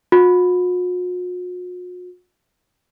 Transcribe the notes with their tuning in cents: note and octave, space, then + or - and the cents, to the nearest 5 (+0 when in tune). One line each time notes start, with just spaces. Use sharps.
F#4 -45